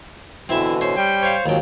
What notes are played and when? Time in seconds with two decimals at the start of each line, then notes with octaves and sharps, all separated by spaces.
0.49 B2 D3 E3 C4 E4 E5
0.81 C#4 C5
0.97 G3 G5
1.23 C5 C#5 F5
1.46 D#2 G#2 F3 F#3 G5